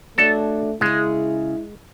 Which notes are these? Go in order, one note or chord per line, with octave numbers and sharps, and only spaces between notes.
A3 D4 F#4 A4 C#5
C#3 G#3 E4 G#4